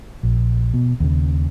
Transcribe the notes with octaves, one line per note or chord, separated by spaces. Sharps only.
A#1
B2
D#2 C#3